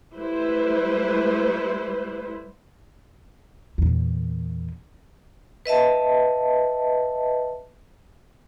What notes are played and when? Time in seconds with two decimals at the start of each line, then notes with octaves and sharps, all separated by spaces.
0.17 G3 A3 E4 B4 C5
3.78 E2 A#2
5.66 B4 D#5 E5 A5